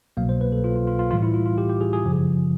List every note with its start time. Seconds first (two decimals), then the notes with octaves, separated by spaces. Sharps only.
0.17 C2 B2 F#3 A#3 F5
0.29 C5
0.41 B4
0.52 A4
0.64 F4
0.76 F4
0.87 F4
0.99 F4
1.11 A2 E3 G3 F4
1.22 E4
1.34 F4
1.46 F4
1.58 G4
1.70 G4
1.81 G#4
1.93 G#4
2.05 F#2 C#3 F3